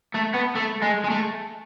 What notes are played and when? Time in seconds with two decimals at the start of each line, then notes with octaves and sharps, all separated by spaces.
0.14 A3
0.34 B3
0.55 A3
0.82 G#3
1.04 G#3
1.10 A3